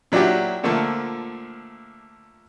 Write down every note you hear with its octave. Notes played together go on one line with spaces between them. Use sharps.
A#2 F#3 D4 E4 F#4 G4
A#2 D3 F3 A3 A#3